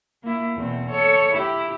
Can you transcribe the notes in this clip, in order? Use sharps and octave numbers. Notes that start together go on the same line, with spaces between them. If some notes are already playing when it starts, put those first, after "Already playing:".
A#3 E4
E2 B2 C4
A4 C#5
E4 G4